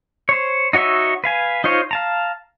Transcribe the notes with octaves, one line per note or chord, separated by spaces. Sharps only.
C5 C#5
D#4 F#4 C#5 D#5 E5
B4 F5 G#5
D#4 F4 C5 C#5 D#5
F5 A5 A#5